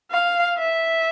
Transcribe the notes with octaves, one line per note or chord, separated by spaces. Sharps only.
F5
E5